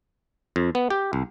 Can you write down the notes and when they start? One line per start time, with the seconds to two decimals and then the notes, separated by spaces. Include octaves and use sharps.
0.56 F2
0.75 B3
0.90 G4
1.13 C2